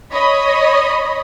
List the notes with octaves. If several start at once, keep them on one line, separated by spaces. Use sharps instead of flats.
C#5 D#5 B5